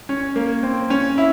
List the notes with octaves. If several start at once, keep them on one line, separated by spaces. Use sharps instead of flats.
C#4
A#3
C4
C#4
E4